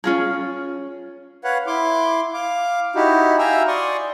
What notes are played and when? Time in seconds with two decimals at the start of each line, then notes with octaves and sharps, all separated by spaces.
0.04 C#4 F4 G#4
1.44 B4 C#5 F5 F#5
1.67 E4 C6 D6
2.34 F5 D6
2.95 D#4 E4 F#4 G4
3.39 E5 F5 G5 G#5 A#5 E6
3.67 D5 C6 C#6 D#6